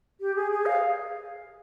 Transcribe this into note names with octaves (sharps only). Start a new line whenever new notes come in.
G4
G#4
G#4
F5